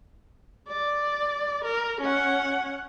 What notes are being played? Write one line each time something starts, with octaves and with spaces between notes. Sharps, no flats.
D5
A#4
C#4 F#5